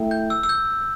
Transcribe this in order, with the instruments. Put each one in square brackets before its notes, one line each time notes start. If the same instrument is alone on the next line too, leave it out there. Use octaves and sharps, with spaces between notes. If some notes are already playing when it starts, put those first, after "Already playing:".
Already playing: [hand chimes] A3 E4 A4 E5 G5
[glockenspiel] G6
E6
E6
G6